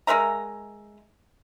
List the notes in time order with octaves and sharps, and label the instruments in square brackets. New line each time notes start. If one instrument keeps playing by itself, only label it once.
[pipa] G#3 A#4 E5 A#5